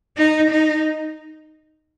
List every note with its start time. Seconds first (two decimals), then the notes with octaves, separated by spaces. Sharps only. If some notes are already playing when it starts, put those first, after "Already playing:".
0.17 D#4
0.51 D#4